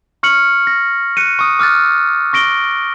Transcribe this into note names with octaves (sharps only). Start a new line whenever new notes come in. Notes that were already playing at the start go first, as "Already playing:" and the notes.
C#6 F6 C#7 F#7
A#6
F#6 C#7 D#7
C#6 D#6
D6 F6 F#6 A6
C#6 A#6 D7 G7